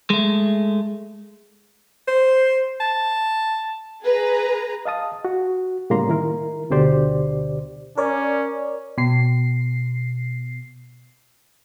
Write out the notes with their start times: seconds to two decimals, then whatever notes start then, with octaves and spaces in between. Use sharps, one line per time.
0.10 G#3 A3
2.08 C5
2.80 A5
4.02 G#4 B4 A#5
4.85 D#5 F5 A5 D#6
5.25 F#4
5.90 A2 C#3 G3 A#3 A#5 C6
6.09 D#3 E4 A#4
6.70 D2 B2 D3 G4 C5 D5
7.98 C#4 A#4 C#5 D5
8.98 B2 C7